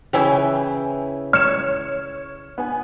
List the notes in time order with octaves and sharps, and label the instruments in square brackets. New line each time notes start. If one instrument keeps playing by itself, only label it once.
[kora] C#3 E3 E4 [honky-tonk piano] G5 G#5
[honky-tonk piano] C#5 C#7 E7 [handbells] F6
[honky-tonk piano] B3 G#5